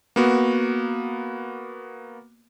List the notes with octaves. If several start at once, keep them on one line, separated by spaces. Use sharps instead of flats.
A#3 B3 F#4